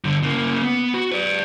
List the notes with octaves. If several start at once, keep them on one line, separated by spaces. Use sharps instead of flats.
G2 D3
C#3 A#3
B3
F#4
B4 D5